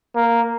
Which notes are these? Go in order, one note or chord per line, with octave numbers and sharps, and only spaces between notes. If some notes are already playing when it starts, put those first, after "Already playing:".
A#3